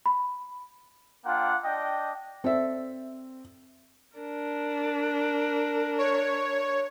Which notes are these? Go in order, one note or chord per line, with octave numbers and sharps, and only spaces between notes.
B5
A#3 D4 F4 F#5 G5
D4 D#5 G5
C4 A4 D5 E5
D4 A#4
C#5